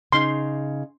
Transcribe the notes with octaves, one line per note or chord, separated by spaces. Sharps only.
C#3 D#4 C6